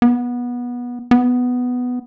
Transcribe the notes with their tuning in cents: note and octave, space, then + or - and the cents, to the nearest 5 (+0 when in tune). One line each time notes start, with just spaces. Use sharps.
B3 -20
B3 +5